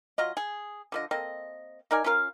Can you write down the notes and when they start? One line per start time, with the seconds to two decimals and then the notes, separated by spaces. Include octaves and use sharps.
0.18 F#3 F4 D#5
0.37 G#4
0.92 D3 F3 D#5
1.11 A#3 C4 A4 D#5
1.91 D#4 A#4 D5 G#5
2.04 C#4 F4 A#4 F5